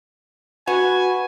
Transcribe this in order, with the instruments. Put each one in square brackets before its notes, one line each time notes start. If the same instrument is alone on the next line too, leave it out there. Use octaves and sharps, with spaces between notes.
[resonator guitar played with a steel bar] F#4 [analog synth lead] B4 [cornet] G#5